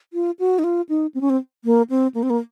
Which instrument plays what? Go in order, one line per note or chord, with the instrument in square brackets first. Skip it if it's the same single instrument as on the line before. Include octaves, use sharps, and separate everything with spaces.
[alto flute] F4
F#4
D#4
F4
D#4
C4
C#4
C4
A#3
C4
A#3
C4
A#3